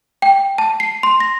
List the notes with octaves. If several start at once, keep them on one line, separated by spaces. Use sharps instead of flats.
G5
A5
C7
C6
A#6